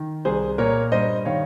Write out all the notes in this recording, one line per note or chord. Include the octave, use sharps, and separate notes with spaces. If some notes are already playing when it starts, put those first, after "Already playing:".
Already playing: D#3
C2 G#4 C5
A#2 A#4 C#5
G2 C5 D#5
D#3 C#5 F5